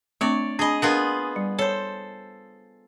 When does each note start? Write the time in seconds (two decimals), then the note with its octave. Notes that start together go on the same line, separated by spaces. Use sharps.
0.21 A3 C4 D4 C#5 D5
0.59 D4 G#4 D#5 G#5 B5
0.82 B3 D4 F4 G#4 A#4 F#5
1.36 G3
1.59 A4 C5 C#5